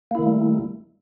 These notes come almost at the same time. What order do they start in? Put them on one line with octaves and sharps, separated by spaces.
A#3 E4 D#3 A3 G3